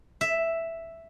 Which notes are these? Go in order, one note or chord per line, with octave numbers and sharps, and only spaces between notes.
E5